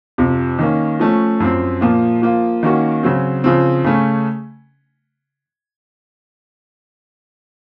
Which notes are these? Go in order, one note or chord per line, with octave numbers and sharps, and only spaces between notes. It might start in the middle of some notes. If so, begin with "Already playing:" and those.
F2 C3 F3
D#3 A#3 C#4
F3 A3 C#4
F#2 F3 C4
A#2 F3 A#3 F4
F3 A#3 F4
D#3 A#3 C#4 F#4
C#3 F#3 C4
C#3 F3 C4
C#3 A3 C#4